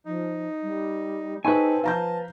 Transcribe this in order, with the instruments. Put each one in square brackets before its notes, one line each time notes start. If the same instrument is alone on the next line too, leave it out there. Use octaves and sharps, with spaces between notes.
[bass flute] F3 [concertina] D#4
[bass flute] G3
[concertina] C4 A4 [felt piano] D#4 C#6 [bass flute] G#4 [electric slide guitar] B4 G#5
[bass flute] F3 [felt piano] F5 A#5 G6 [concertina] A5